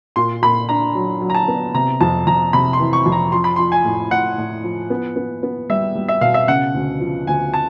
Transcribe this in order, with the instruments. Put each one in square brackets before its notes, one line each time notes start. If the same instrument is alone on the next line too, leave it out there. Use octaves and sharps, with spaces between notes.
[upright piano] A#2 [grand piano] C6
[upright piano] A#2 [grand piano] B5
[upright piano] D4 [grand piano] A#5
[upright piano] F#3
F#3
[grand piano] A#5
A5
[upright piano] B3
[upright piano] C3 [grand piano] A#5
[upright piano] F2 [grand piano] A5
[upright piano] F2 [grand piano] A#5
[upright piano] C3 [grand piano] B5
[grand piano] C6
[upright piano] E3
[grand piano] C#6
[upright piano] F2
[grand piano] A#5
[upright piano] F3 [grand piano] C6
[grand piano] B5
[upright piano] F3 [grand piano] C6
[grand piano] G#5
[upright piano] A2
[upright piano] A2 [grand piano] F#5
[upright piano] A2
F3
B3
B3
B3
[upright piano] G3 [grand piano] E5
[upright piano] G3
[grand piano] E5
[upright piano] B2 [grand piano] F5
[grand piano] E5
[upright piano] C#3 [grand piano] F#5
[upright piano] D2
F3
[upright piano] D2 [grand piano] G#5
[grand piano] A5